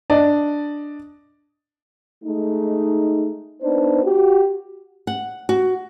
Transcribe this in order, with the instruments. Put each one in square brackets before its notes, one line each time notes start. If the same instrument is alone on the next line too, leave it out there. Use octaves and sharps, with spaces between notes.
[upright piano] D4 D5 D#5
[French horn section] G#3 A3 D#4
B3 D4 D#4 C5
F#4 G4
[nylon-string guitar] F#5
F#4